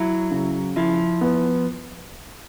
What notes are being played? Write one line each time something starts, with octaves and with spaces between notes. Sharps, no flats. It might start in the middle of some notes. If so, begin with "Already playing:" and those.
Already playing: F#3 E4
C#3
F3 E4
B3